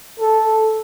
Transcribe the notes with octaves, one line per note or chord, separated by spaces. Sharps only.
A4